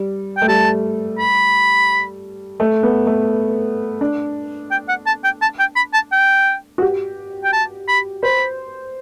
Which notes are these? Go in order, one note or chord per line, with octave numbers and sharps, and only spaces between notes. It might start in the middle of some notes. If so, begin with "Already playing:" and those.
Already playing: G3
A3 G5
G3 A5
B5
A3
B3
A3
D4
G5
F#5
A5
G5
A5
G5
B5
A5
G5
F#4
G4
G5
A5
B5
C5 B5